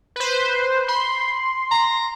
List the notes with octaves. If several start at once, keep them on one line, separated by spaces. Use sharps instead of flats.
B4 C5
B5 C6
A#5